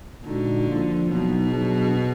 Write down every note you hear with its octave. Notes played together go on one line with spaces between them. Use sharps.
A#2 D3 G#3 D#4 F#4
F3 A#3 F4
B2 F#3 B3 D#4
F#3 D4 G#4